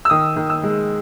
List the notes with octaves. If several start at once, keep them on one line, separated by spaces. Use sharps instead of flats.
E6
D#3 D#6
D#3
E6
G#3